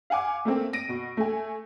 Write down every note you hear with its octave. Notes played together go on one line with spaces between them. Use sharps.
F5 F#5 G#5 D6
A3 A#3 C4
A#6 D7 D#7
B2
A3 G#5